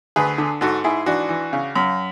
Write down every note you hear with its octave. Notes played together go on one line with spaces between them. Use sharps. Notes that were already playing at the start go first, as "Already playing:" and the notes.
D2 G#4 B4
D3
G#2 F#4 A4
G#2 E4 G#4
E3 D4 F#4
E3
C#3
F#2